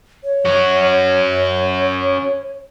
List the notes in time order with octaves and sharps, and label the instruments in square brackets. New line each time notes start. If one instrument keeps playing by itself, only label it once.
[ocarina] C#5
[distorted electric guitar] C#4 F#4